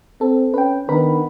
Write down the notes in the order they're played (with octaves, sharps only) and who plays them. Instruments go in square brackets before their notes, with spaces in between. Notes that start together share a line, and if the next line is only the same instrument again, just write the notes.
[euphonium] C4 [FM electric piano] A4
[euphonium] C#4 [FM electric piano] B4 G5
[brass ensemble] D#3 B3 [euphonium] D4 [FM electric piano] A#4 B4 B5